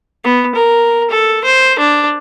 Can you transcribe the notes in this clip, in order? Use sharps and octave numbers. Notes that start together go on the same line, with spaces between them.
B3
A#4
A4
C5
D4